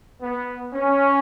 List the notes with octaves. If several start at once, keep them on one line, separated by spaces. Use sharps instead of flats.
B3
C#4